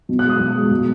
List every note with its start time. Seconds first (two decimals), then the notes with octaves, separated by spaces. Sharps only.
0.09 B2
0.19 F#6
0.24 G#3
0.30 D#6
0.40 B2
0.56 G#3
0.71 B2